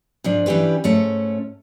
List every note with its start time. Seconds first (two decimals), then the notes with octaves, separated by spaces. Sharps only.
0.24 G#2 F3 D4
0.46 E3 C#4 D4 G4 B4
0.84 G#2 A3 C#4